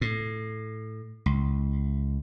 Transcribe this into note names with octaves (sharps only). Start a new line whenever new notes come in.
A2
C#2